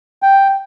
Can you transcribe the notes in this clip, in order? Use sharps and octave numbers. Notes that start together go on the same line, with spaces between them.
G5